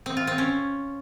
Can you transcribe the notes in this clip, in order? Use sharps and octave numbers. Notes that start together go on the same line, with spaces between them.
C4
F4
C4
C#4